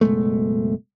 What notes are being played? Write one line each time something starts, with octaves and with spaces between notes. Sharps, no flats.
F#1 B2 G#3 A3